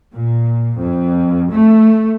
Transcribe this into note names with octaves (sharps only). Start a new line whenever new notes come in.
A#2
F2
A3